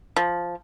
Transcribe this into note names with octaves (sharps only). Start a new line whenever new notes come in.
F3